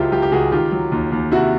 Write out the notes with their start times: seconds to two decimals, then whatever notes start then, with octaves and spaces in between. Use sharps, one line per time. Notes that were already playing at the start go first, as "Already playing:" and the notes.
Already playing: C#2 F#3 E4 F4 G4
0.12 F#3 F4 G4
0.22 G4
0.32 C#2 F#4 G#4
0.52 D#3 F4 G4
0.72 F#3
0.92 D#2
1.12 D#2
1.32 C3 E4 F#4